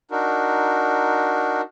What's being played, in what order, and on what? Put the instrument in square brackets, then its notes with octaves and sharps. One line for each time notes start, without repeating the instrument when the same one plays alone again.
[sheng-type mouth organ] D4 D#4 F#4 A#4